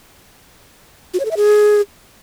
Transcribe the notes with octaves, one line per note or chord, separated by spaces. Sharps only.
F#4
C#5
A4
E5
G#4